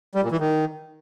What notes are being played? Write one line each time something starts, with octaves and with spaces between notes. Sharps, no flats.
G3
A#2
E3
D#3